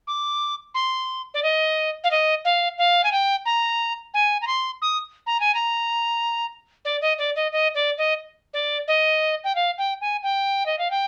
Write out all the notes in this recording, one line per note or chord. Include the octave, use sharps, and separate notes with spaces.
D6
C6
D5
D#5
F5
D#5
F5
F5
G#5
G5
A#5
G#5
A#5
C6
D#6
A#5
G#5
A#5
D5
D#5
D5
D#5
D#5
D5
D#5
D5
D#5
G5
F5
G5
G#5
G5
D#5
F5
G5